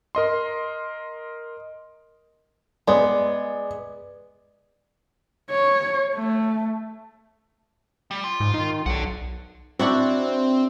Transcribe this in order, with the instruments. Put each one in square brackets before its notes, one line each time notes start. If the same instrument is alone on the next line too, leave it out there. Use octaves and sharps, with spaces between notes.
[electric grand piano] A#4 D#5 C6
[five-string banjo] G#3 B3 [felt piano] D5
[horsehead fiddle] C#5
A3
[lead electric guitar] G3
F4
[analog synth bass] G#2
D#3
[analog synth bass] B1 [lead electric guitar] D5 F#5
[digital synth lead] C4 [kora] D4 E4 F#4